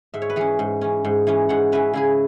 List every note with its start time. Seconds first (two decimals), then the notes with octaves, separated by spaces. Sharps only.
0.14 G#2 E5
0.22 C#5
0.30 B4
0.36 E3 C#4 G#4 C#5
0.59 G#2
0.81 E3 C#4
1.05 G#2
1.27 E3 C#4
1.49 G#2 C#5 F#5
1.72 E3 C#4 B4 E5
1.93 C#3 E4 G#4